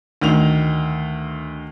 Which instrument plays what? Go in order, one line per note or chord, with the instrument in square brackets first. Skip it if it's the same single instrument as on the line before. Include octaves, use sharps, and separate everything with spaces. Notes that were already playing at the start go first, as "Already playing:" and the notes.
[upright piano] D2 D#3 F7